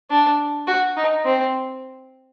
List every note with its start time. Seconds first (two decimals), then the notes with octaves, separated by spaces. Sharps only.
0.10 D4
0.67 F#4
0.97 D#4
1.25 C4